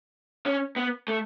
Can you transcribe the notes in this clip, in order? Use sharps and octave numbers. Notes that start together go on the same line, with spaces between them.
C#4
B3
A3